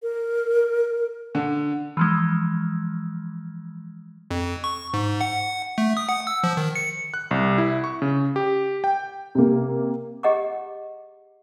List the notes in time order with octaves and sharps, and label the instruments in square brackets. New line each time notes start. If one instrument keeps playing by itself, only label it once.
[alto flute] A#4
[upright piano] D3
[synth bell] E3 F3 G#3
[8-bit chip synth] F2
C#6
G#2
F#5
A3
D#6
F#5
E6
F3
D#3
C#7
[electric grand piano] F#6
C2
E4
C#6
C#3
G4
G5
[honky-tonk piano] C3 A#3
[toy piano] G4 G#4 D#5 F#5 A#5 D6